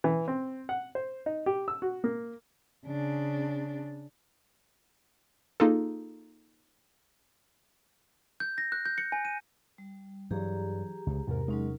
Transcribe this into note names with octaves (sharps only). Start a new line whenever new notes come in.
E3
C4
F#5
C5
D#4
G4
E6
F#4
A#3
C#3 D4
A#3 D#4 F4 G#4 A4
G6
A#6
F#6
G6
C#7
G#5
D#7
G3
G2 E3 F#3 G4 G#4 A#5
C#2
E2 G#2 C3 A#4
F#3 G#3 C#4 D#4